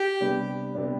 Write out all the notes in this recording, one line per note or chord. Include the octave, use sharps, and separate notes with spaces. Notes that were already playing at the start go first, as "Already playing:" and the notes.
Already playing: G4
C3 G3 B3 D4
C3 G3 B3 D4